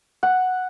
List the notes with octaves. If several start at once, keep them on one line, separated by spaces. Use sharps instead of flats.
F#5